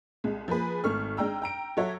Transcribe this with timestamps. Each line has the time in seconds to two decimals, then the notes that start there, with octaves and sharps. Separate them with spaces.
0.24 C2 G#3
0.48 F3 A#3 G#4 B4
0.84 G#1 A3 C#6 F6
1.17 G#3 D4 G5 A#5 E6
1.42 G5 A#5 D7
1.77 F#3 F#4 A4 C#5 E5